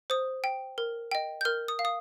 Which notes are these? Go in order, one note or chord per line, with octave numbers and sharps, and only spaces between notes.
C5 D#6
G5
A#4
D#5 G5
G6
A#4 F6
D#6
F5
D#6